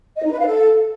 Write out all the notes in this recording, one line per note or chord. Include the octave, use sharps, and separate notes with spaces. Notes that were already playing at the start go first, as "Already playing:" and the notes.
D#5
D#4
B4
F5
A4